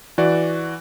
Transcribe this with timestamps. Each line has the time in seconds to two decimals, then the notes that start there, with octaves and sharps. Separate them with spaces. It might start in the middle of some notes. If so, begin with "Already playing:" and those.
0.18 E3 F#4 D5